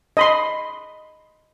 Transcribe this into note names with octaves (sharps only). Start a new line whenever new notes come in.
D#5 B5 C6